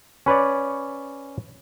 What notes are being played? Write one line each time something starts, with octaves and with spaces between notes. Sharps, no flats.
C#4 B4 C#5 D5